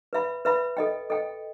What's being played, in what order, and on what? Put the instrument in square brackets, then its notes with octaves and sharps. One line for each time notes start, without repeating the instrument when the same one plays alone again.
[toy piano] B4 E5 B5
B4 E5 B5
A4 D#5 G5
A4 D#5 G5